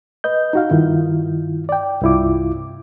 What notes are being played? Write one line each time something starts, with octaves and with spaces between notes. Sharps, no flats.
B4 D#5 G6
D#4 F#4 F5
G2 D#3 E4 F4
D5 G5
C2 G2 E4 F4 D6